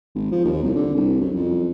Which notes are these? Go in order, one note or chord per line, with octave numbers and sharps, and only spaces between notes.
G#1
F3
D#2
C2
D3
C2
F#2
F2